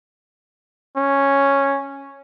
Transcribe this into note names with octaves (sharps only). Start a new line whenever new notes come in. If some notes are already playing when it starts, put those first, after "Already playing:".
C#4